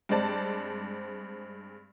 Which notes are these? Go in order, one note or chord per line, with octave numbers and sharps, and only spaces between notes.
G2 G#3 C4 D5 A5